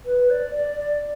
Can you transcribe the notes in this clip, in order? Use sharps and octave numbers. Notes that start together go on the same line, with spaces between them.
B4
D5
D5
D5